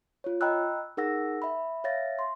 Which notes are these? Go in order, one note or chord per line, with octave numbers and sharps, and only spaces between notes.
F4 C#5
D#5 G5 A#5 B5 E6 F#6
D#4 G#4 A#4 F#5 E6 A#6
E5 B5
C#5 E5 F5 A6 A#6
C6